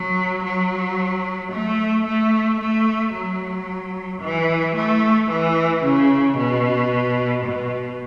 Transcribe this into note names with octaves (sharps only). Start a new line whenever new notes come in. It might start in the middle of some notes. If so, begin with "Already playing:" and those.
Already playing: F#3
F#3
A3
A3
A3
F#3
E3
A3
E3
C#3
B2
B2